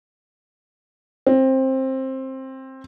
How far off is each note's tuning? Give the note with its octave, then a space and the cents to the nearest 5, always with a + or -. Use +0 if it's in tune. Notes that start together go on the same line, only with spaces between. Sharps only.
C4 +15